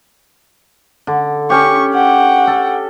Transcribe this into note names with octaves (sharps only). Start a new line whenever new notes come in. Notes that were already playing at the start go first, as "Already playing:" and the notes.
D3
C#4 G4 C#6
F#5 G5
A4